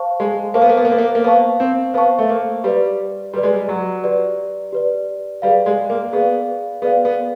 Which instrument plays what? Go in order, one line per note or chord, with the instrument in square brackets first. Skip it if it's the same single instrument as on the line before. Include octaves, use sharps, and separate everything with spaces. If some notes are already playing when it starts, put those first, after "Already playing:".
Already playing: [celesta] C5 F5 A5 C#6
[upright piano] G#3
[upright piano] A#3 [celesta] C5 F5 A5 C#6
[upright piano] B3
A#3
B3
A#3
B3
A#3
A#3
[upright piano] B3 [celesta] C5 F5 A5 C#6
[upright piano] C4
[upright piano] B3 [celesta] C5 F5 A5 C#6
[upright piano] A3
A#3
[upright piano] G3 [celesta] G4 B4 D5
[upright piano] G3 [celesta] G4 B4 D5
[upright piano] G#3
G3
F#3
[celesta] G4 B4 D5
G4 B4 D5
[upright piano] G3 [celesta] G#4 B4 D5 F5
[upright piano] G#3
A#3
[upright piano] B3 [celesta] G#4 B4 D5 F5
[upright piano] B3 [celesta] G#4 B4 D5 F5
[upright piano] B3